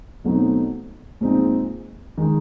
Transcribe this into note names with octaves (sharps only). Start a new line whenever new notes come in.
B2 F#3 A3 C4 D#4
A#2 F3 G#3 C4 D#4
D#3 G#3